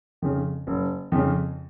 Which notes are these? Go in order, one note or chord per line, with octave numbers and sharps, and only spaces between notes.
F2 C#3
F#1
F2 C#3